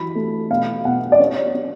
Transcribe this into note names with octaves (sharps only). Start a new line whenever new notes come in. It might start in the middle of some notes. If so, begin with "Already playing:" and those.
Already playing: E3 F#3 B5
A3
B2 F5
B2 F#5
D5
C#4 C#5
C#4